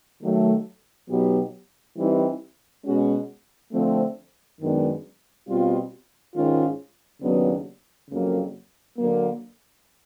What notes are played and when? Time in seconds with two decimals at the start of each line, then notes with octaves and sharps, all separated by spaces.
0.21 D#3 F#3 A3
1.09 B2 F#3 B3 D#4 G4
1.96 E3 G3 C4 D#4
2.84 B2 G#3 C#4 F#4
3.72 D3 F3 A3 C4
4.59 F#2 D#3 G#3 B3 D4
5.47 B2 G3 C4 F4
6.34 G#2 D#3 G#3 C#4 F4
7.22 D#2 C#3 F#3 B3 D4
8.10 F2 C#3 F#3 A#3
8.97 D3 F#3 A#3